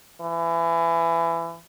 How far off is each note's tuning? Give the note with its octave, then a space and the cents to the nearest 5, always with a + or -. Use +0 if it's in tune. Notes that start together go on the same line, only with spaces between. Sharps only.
E3 +25